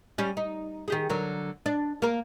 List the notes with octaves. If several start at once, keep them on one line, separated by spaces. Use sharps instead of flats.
G3 C#4
D#4
D#3 G4 G#4
D3 F#3 A#4
D4
A#3 A#4